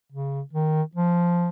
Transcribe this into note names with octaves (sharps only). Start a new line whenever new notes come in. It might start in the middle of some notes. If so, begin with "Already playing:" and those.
C#3
D#3
F3